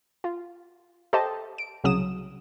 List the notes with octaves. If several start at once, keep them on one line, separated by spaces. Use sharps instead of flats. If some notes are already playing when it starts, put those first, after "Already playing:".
F4
G4 A4 C5 D#5 A5
D7
C2 C#3 F#3 D#6 E7